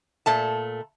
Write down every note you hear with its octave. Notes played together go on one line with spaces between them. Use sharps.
A#2 A3 A5